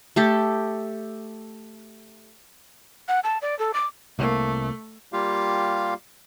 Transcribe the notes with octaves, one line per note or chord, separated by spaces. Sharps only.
A3 G4 A4
F#5
A5
D5
A4
D6
C2 A3 A#3
G3 A#3 F4 G4 F5